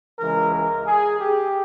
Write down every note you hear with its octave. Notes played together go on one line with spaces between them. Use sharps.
C#2 C#3 E3 G#3 A#4
A#4
G#4
G4